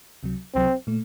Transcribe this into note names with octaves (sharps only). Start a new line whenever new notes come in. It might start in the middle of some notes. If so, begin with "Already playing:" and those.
C#2 C3 F#3
C#2 C3 F#3 C4
A#2 A3